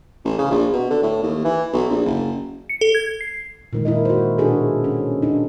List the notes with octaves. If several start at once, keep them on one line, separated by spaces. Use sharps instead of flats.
A1
C#3
A#1
B2
D3
A2
D#2
E3
B1
A#1
F#1
C#7
A4
G#6
C7
A#2 D#3 G#3
E4 A#4 D#5
F#4 C5
B2 D4 F4 F#4 G#4 A4
C#4
D4 D#4